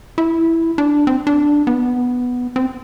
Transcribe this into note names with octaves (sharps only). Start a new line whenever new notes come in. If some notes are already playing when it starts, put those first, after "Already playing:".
E4
D4
C4
D4
B3
C4